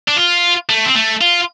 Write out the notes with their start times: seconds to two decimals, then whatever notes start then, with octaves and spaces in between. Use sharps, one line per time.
0.08 D4
0.17 F4
0.69 A3
0.86 C4
0.95 A3
1.21 F4